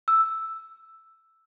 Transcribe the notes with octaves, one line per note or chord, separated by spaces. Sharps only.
E6